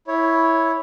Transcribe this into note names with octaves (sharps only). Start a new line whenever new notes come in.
E4 C#5